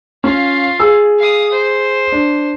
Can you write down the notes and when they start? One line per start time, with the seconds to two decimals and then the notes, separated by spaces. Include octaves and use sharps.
0.24 C#4 F4 F5
0.80 G#4 E6
1.19 F5 D#6
1.52 C5
2.12 D4